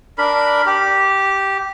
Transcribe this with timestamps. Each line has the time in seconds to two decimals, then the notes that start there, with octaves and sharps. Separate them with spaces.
0.18 D4 A#4 B5
0.66 G4